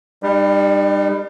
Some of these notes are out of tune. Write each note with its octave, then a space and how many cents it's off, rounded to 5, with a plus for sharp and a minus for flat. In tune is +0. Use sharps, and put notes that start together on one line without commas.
G3 +20 D#4 -35